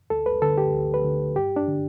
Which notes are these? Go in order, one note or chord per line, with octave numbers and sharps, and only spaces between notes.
D2 A4
B4
D3 A4
G4
D2
B4
D3
G2 G4
D4
D3